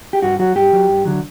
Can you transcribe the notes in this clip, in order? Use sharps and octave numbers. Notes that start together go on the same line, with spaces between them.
G4
G2 F#4
F#3 F#4
G2 G4
F#3
G2
D3 F#3